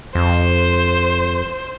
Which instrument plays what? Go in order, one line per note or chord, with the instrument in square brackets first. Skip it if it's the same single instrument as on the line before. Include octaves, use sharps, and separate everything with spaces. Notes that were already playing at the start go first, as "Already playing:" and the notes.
[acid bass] F2 [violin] C5